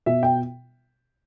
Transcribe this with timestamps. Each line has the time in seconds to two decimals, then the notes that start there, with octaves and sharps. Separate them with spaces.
0.06 B2 E5
0.23 G5